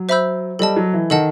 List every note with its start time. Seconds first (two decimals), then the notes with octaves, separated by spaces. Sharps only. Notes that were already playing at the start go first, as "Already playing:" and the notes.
Already playing: F#3
0.09 C5 E5 B5 E6 G6
0.59 G3 A4 D#5 A5
0.76 F#3
0.93 E3
1.10 D#3 A4 D#5 F#5 A5